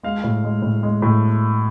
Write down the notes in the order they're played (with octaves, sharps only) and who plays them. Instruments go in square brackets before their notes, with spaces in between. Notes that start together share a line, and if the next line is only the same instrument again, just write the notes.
[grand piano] G#3 F5
A2
G#3
A2
G#3
A2